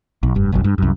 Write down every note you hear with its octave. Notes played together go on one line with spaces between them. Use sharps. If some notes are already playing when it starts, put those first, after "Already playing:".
B1
F1 G2
F#1 B1 F#2
G2
C2 F#2